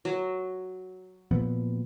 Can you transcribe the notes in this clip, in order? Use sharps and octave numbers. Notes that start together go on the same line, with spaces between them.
F#3
A#2 F3 B3